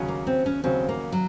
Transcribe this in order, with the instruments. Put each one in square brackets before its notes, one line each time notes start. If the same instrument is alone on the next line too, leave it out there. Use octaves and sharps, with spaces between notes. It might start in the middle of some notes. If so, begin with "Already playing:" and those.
Already playing: [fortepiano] D#2 C#3 F#3 C#4
[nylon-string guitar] A#3
C4
C#4
[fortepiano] D#2 C#3 F#3 C#4 [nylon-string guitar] C4
[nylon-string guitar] A#3
F#3